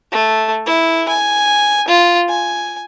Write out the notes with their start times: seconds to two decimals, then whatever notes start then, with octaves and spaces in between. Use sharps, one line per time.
0.12 A3
0.66 E4
1.08 G#5
1.88 F4
2.29 G#5